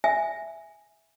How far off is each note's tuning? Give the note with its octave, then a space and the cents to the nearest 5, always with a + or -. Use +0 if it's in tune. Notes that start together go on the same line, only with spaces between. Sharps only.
E5 +0 G#5 +0